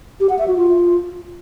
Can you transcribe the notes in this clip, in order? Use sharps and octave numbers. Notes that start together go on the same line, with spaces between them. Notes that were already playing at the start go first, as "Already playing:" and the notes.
G4
F#5
E5
F#4
F4